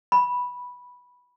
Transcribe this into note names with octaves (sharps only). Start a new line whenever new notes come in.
B5